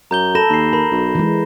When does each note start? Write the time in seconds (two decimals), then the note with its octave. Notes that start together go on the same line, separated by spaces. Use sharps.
0.11 F#2 A#5 G6 G7
0.35 A4 B5 A#6 E7
0.50 D#2 B5 C7
0.73 A#4 B5
0.91 B1
1.15 E3 G#3